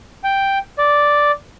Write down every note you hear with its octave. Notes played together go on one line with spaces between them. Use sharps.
G5
D5